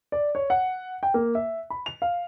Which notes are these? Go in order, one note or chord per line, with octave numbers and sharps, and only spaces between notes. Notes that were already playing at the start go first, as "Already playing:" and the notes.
D5
C#5
F#5
G5
A#3
E5
B5
F7
F5